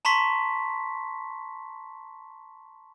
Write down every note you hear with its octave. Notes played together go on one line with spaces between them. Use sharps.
A5 A#5 C6 C#6 B6